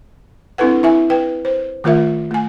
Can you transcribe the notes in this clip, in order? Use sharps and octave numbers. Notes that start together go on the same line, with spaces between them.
C4 D4 E4 A4 B4 F#5
E4 E5 G#5
B4 G5
C5
D#3 A3 F4 A#4 E5
A3 G#5